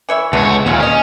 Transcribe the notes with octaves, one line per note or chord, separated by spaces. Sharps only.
E3 C#5 E5
C#2 D3 A3 B3 C#5
D#2 A#2 C#4 C#5 F5
C#4 G#4 D#5